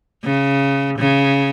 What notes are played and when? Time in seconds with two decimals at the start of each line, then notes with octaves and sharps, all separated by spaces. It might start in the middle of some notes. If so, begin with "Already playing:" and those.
0.24 C#3
0.98 C#3